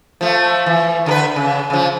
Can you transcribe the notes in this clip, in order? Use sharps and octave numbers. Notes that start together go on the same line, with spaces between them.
F3 A3
E3
D3 A#4 B4
C#3
C#3 F3